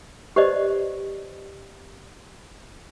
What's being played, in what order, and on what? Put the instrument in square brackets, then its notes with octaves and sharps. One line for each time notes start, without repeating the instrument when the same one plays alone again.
[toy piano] G4 B4 C5 D5 D#5